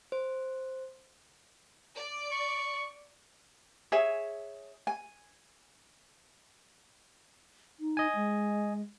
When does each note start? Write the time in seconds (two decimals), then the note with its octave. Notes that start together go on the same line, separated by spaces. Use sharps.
0.12 C5
1.94 D5
2.32 C#6
3.92 G#4 C#5 E5 G#5
4.87 G#5
7.80 D#4
7.97 D#5 G#5
8.15 G#3